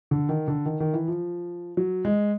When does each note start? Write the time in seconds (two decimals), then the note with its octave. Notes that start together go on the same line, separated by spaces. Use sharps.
0.11 D3
0.29 D#3
0.48 D3
0.66 D#3
0.80 D#3
0.94 E3
1.08 F3
1.77 F#3
2.05 G#3